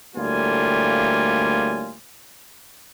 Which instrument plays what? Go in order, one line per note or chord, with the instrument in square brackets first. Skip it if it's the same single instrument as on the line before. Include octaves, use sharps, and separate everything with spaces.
[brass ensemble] D2 A2 G3 A#3 F4 G#5